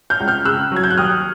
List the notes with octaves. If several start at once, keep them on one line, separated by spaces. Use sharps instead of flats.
F6 G6
C#2
F6 G6
C#3 E6 F#6
F#3 G#6
G6
F#6
D#2 D#6 F6